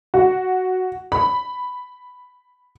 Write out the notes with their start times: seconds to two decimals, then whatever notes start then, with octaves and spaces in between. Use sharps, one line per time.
0.14 F#4
1.12 B5